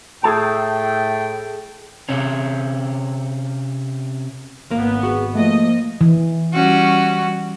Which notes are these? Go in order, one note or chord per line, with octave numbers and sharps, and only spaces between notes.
A2 A3 G#4 A4 G5 A5
C3 C#4
G#1 A#3 B3
F#4 G#4
F3 A3 A#3 D#5
E3
G3 C#4 F#4